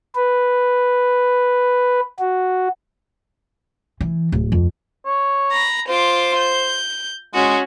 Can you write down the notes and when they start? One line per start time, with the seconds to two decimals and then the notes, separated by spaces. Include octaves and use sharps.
0.15 B4
2.19 F#4
4.01 E3
4.32 D1
4.52 F2
5.06 C#5
5.52 A#5 B5
5.89 F4 C5 D6
6.38 G6
7.34 G#3 C#4 F#4